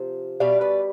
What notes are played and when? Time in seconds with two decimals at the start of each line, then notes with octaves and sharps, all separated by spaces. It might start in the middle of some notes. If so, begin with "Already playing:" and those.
Already playing: C3 F3
0.40 B2 G3 D5 F5
0.61 B4 D5